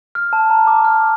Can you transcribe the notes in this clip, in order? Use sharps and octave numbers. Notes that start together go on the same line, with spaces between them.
F6
A5
A#5
D6
F6